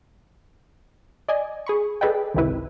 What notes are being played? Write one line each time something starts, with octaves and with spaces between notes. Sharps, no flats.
D5 D#5 G#5
G#4 B5 C#6
G#4 A4 B4 D5 D#5 G5
G#1 C#2 C3 D#3 E4 B4